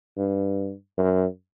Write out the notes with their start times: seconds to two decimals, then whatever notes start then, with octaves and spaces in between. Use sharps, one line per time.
0.17 G2
0.98 F#2